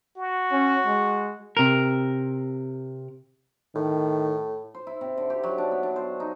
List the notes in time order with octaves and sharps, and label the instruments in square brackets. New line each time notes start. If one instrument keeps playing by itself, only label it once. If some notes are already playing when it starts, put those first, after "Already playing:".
[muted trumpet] F#4
[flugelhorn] C#4
G#3
[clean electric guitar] C3 A#4
[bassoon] A2 [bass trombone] D#3
[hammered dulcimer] C5
E4
C3
D3
G4
F#3
D4
B3
D4
C5
D#4